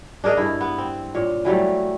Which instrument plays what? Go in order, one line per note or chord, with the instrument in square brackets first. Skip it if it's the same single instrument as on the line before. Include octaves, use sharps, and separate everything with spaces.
[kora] D4 G#4 A#4 D#5
G2 E4
B3
C4
A#2 C#5
E3 F#3 G3 A3